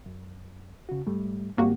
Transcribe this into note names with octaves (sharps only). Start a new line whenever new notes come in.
F#2
C#3 F#4
G#2 G3 A3
G#1 G3 A#3 F#4 G4